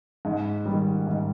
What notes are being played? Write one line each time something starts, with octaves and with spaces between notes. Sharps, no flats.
G#2
D#3 G3
G#2